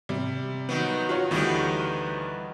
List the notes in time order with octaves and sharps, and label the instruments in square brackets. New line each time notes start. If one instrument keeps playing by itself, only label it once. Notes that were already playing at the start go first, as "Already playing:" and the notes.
[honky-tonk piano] C3 G3
[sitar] D#3 F#3 [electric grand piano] B3
[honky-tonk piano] F4 F#4 C#5
[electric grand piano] D2 G3 [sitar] D#3 E3 B3